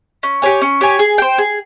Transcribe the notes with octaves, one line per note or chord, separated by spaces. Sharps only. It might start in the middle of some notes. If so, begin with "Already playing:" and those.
C#4
G4 C#5 G#5
C#4
G4 C#5 G#5
G#4
C5 G5
G#4